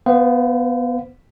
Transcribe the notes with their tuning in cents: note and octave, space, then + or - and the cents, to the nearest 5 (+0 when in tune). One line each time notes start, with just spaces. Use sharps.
B3 +0 C5 -40 F5 +0